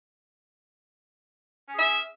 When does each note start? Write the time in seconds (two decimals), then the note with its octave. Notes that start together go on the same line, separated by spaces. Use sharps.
1.69 C#4
1.74 G#4
1.78 E5